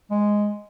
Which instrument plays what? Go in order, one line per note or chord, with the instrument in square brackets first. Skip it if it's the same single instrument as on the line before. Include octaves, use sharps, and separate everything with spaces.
[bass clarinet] G#3